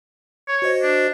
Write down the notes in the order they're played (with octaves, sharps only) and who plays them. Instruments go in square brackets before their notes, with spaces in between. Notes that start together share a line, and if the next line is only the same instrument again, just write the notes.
[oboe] C#5
[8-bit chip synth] F#4 C5 D#5
[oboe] D4